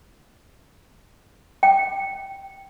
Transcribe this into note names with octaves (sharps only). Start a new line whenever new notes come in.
G5